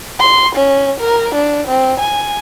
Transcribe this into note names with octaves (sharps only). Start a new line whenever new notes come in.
C6
C#4
A#4
D4
C4
G#5